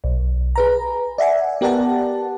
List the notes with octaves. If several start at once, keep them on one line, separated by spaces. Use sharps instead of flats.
B1
G#4 B4 A#5
D5 E5 F#5 G#5
B3 G4 A#4 D5 F#5 A5